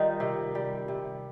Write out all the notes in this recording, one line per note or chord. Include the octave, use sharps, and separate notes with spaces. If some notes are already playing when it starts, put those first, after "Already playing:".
Already playing: D#3 G3 D#4 F4
C3
G3
C3